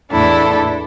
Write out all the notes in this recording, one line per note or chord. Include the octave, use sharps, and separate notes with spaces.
E2 A2 D4 E4 A4